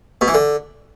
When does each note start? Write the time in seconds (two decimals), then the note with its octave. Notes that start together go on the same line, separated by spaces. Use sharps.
0.21 B2
0.28 E3
0.34 D3